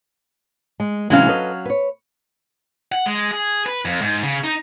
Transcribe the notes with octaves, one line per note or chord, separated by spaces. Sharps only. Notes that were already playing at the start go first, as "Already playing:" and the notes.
G#3
C3 E3 F#3 G#3 C#4 F5
A4 B4 D#5
B4 C#5
F#5
G#3
G#4
B4
F2
G#2
C#3
D#4